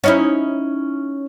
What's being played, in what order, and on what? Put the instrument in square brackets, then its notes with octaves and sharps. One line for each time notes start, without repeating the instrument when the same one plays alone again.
[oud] C#4 D#4 E4